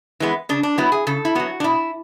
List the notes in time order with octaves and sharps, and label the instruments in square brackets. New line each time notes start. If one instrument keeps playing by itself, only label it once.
[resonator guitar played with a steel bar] E3 G#3 B3
C#3 D4
D4
F#3 B3 E4
G#4
C#3 A4
E4
F#3 B3 F#4
D4
B2 E4